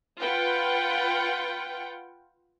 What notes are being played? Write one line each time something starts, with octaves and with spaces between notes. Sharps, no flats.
F4 B4 F#5 G5